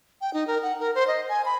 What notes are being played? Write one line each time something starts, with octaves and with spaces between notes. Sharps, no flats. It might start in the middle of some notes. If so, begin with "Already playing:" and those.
G5
D#4
A#4
F#5
A#4
C5
D#5
G#5
B5